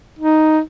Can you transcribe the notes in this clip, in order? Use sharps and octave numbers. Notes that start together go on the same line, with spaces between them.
D#4